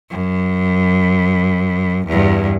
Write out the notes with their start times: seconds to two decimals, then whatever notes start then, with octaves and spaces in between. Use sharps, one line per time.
0.10 F#2
2.07 E2 G2